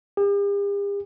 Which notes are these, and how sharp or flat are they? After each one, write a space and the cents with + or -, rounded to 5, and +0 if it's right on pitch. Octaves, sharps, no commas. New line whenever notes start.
G4 +45